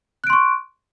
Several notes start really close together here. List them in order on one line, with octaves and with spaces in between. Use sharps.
F#6 D7 C6 C#6